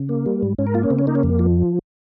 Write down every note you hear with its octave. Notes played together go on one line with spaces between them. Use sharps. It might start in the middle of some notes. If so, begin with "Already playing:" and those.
Already playing: C#3
A#3
G3
G#2
G#2 C#4
A#4
A#3 F4
C#4
C#3 C4
C#4
A#3 D#4
C#4
F2
F3